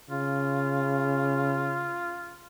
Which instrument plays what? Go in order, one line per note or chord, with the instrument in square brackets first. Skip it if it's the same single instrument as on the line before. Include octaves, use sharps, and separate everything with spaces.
[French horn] C#3 [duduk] F4